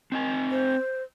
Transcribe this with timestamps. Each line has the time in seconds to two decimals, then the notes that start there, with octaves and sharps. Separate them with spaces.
0.12 C4 D#5 G#5
0.51 C5